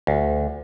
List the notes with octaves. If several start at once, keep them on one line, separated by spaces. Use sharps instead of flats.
D2